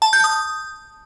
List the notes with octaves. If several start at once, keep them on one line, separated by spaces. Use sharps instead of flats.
A5
G6
D#6